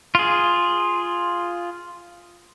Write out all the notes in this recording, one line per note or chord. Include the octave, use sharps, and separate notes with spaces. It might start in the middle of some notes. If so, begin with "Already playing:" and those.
F4 G#4